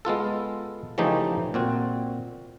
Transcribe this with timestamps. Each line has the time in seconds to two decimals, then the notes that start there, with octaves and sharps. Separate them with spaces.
0.05 G#3 B3 F4 A4
0.98 C#3 E3 F3 A3 D#4 G4
1.54 A#2 C4 F#4